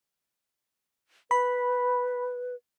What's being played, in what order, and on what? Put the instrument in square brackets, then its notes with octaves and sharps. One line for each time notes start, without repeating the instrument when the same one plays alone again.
[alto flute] B4 [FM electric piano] B5